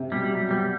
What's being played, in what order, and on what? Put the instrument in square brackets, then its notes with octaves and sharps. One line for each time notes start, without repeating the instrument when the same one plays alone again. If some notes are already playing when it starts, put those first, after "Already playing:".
Already playing: [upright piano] C3
[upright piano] B2 [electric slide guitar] G3
[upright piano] F#3
[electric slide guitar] G3 [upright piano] B3